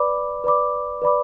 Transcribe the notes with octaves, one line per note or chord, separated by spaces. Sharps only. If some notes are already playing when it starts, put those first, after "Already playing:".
Already playing: B4 D5 B5 D6
B4 D5 B5 D6
B4 D5 B5 D6